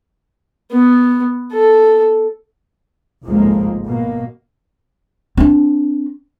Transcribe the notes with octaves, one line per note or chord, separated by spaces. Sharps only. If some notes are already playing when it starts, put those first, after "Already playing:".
B3
A4
G#1 C#2 A2 F3 G#3 A#3
B2 A#3
C4 D4